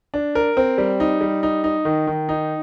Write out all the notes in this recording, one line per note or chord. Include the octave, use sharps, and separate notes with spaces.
D4
A#4
C4
G3
D#4
G3
D#4
D#4
D#3
D#3
D#4